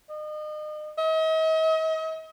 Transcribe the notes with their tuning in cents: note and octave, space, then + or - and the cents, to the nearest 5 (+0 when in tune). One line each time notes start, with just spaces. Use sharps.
D#5 -35
D#5 +40